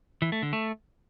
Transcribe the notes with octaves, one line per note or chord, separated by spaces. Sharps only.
E3
A3
D3
A3